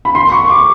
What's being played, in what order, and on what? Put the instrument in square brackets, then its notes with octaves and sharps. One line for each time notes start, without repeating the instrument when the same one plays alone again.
[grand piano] B5
C6
C#6
D6